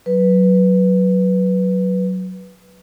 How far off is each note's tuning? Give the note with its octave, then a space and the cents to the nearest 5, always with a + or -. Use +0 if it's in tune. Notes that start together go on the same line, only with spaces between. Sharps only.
F#3 +0 B4 -5